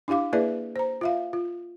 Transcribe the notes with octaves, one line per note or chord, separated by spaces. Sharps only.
D4 E4 G4 F5 D6
A#3 E4 G#4 B4 D5 E5
C5 A#5
F4 E5 F5
F4